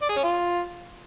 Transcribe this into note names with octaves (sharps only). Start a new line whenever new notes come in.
D5
G#4
C#4
F4